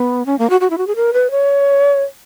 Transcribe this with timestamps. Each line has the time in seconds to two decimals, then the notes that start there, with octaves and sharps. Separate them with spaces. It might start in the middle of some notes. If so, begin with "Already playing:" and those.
Already playing: B3
0.26 C#4
0.39 A#3
0.50 F#4
0.61 F#4
0.70 E4
0.78 F#4
0.87 G#4
0.96 A#4
1.13 B4
1.31 C#5